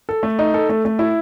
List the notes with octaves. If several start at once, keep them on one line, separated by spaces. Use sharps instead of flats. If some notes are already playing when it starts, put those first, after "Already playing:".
A4
A3
D#4
A4
A3
A3
E4